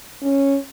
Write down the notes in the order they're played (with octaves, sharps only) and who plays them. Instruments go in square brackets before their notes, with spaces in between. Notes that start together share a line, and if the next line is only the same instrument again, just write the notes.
[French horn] C#4